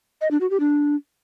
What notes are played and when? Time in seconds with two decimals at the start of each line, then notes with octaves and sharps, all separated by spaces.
0.21 D#5
0.31 D4
0.41 F#4
0.50 G4
0.60 D4